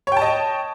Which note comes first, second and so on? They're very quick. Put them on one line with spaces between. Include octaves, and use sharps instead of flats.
C#5 G5 A5 D#5